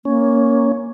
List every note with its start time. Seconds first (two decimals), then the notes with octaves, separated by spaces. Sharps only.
0.05 A#3 C#4